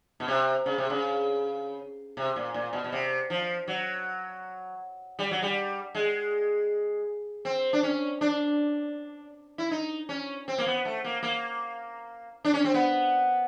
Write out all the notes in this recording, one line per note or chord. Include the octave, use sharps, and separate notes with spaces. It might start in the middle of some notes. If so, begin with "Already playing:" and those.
B2
C3
C#3
C3
C#3
C3
A#2
A#2
B2
B2
C3
F3
F#3
G3
F#3
G3
G#3
C4
D4
C#4
D4
E4
D#4
C#4
C4
A#3
B3
A3
A#3
A#3
D4
C#4
C4
B3